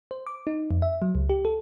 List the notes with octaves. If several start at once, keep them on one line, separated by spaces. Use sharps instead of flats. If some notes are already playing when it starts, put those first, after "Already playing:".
C5
D6
D#4
F2
E5
F#3
C#2
G4
A4